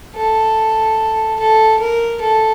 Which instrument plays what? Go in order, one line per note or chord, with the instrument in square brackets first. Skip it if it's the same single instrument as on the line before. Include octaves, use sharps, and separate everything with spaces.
[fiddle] A4
A4
A#4
A4